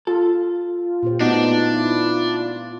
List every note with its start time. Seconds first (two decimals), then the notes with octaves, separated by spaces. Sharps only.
0.07 F4 A4
1.03 A#2 G4 C5
1.21 A3 B3 D4 D#4 F#4
1.70 E4